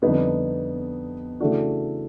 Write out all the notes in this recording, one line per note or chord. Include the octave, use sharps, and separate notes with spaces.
F2 D3 G3 B3 D#4
C#3 E3 A3 D4 F#4